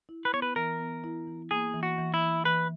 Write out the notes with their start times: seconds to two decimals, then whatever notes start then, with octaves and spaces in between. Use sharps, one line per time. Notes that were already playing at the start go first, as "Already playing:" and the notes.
0.09 E4
0.25 B4
0.33 B3 C#5
0.42 B4
0.56 E3 A#4
0.80 B3
1.04 E4
1.27 E3
1.51 A#3 G#4
1.74 E3
1.83 F#4
1.98 E3
2.14 E4
2.22 E3
2.45 E3 B4